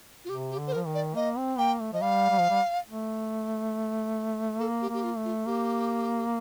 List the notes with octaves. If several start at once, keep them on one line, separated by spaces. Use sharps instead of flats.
F4
C3 G4
G4
D3
C5
A#4
F3
D#3
D5
A#3 D#5
C4
A#3 G5
A3
F3 D#5
G3 F5
G3
F3
G3
A3
A#3 A4
G4
A#3
G4
F4
A3
F4
A#3 G4